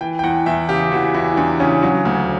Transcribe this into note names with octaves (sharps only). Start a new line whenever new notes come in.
E3 G5
G5
E2 F#5
E2 E5
C#3 G4
E3 F#4
E2 E4
E2 D4
C#3 C#4
F#3 C#4
D2